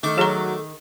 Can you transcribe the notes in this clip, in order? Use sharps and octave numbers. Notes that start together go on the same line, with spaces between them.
D#3 A3 A4 D6
F#3 G#4 A#5